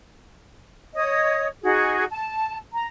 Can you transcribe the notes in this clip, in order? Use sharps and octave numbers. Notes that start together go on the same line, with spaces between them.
C#5 D#5 D#6
D#4 F#4 G#4
A5
A#5